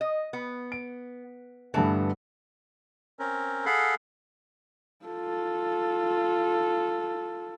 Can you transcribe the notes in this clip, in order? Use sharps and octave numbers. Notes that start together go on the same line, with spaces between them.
D#5
B3
D7
G2 D3 E3 A3 B3 A5
C4 C#4 A#4
G#4 A4 F5 F#5 B5
F4 A4